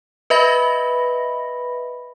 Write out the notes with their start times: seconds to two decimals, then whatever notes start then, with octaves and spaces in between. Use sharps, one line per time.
0.30 B4 D#5 E5 B5 A#6